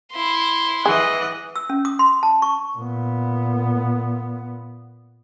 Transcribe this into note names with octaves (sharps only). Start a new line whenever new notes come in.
E4 C6
E3 G#4 D#5 F#5
E6
C#4
D#6
C6
A5
C#6
A#2 B3